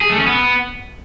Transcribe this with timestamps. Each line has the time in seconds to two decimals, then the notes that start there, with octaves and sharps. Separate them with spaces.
0.01 G#4
0.10 A3
0.18 C#4
0.27 B3